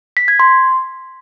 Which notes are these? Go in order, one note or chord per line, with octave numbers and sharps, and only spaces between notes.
B6
G#6
C6